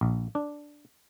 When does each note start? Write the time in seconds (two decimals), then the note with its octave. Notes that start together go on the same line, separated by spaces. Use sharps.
0.01 A#1
0.35 D4